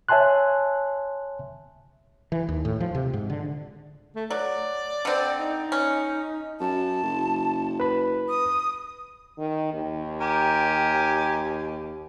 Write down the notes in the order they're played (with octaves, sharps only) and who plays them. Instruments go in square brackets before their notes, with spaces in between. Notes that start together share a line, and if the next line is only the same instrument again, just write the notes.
[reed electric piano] C#5 E5 G#5 A5 C6 F#6
[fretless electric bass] E3
D#2
A2
F3
C3
G#2
D3
[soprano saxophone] A3
[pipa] F#3 [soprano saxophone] D5
[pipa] D3 C4
[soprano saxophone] D#4
[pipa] C#4
[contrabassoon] F#2 [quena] A5
[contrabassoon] F#1
[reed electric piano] B4 B5
[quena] D#6
[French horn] D#3
D#2
[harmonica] G4 A#4 G#5